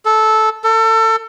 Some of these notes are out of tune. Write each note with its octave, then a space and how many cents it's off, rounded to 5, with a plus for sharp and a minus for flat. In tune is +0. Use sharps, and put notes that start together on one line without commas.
A4 -10
A4 +30